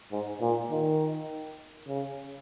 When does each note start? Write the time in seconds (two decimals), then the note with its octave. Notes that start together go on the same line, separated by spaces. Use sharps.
0.12 G#2
0.41 A#2
0.70 D#3
1.88 C#3